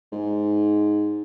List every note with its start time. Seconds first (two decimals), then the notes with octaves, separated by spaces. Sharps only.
0.12 G#2